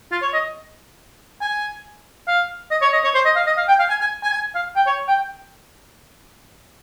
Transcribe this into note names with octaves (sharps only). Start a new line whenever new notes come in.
F4
C#5
D#5
G#5
F5
D#5
C#5
D#5
C#5
C5
D#5
F5
D#5
F5
G5
F5
G#5
G#5
G#5
G#5
F5
G5
C#5
G5